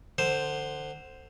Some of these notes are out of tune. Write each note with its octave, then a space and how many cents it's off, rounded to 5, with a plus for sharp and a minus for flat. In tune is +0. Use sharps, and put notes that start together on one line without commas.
D3 +25 C5 +0